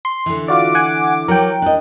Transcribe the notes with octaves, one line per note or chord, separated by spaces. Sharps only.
C6
D3 E3
F4 F#4 D5 D6
F#5 G#5
F#3 A#4 G5
D4 D#5